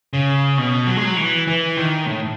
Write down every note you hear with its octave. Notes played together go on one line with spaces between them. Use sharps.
C#3
B2
F#3
G#3
F#3
E3
E3
D#3
A2